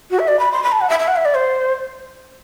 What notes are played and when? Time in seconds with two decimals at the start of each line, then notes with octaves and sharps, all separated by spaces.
0.11 F#4
0.19 E5
0.28 D5
0.39 B5
0.52 C6
0.63 B5
0.72 A5
0.81 F#5
0.89 E5
0.99 E5
1.08 F#5
1.16 E5
1.25 D5
1.35 C5